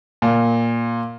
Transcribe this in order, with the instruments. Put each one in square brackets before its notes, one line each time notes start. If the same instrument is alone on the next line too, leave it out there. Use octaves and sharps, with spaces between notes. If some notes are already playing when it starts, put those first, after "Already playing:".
[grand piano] A#2